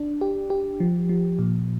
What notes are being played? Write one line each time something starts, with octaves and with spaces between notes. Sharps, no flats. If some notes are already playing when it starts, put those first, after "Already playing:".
Already playing: D4
G4
G4
F3
F3
A#2